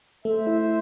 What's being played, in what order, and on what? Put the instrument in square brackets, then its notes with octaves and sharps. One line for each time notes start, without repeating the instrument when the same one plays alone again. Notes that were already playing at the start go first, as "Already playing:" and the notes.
[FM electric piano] A3 [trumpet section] C5 E5
[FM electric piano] E4